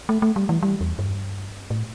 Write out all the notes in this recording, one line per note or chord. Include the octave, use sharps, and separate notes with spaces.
A3
A3
G3
E3
G3
E2
G2
A2